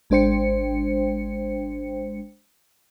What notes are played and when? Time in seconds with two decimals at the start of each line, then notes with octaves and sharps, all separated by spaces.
0.10 G#1 G#3 D4 C5 G5 C#7